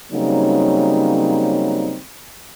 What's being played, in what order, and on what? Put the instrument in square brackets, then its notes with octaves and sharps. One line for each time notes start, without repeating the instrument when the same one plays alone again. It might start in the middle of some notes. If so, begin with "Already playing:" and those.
[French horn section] C#3 F#3 G3 A#3 C4 D#4